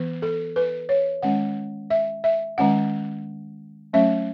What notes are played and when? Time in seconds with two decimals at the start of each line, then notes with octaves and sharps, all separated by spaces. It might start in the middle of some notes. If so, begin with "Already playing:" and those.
Already playing: E3 B3
0.22 A4
0.56 B4
0.89 C#5
1.23 D#3 G#3 C#4 F#5
1.90 E5
2.24 E5
2.58 D#3 G#3 C#4 F#5
3.93 F#3 A3 C#4 E5